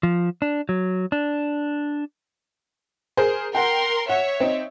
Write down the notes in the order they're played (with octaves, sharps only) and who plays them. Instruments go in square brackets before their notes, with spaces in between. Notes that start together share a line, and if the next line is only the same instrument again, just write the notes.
[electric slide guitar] F3
D4
F#3
D4
[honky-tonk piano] G#4 A#4 C5
[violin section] A#4 C6 [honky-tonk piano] F#5 G5
[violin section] C#5 E5 [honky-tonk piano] F#5
[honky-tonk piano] C4 D#4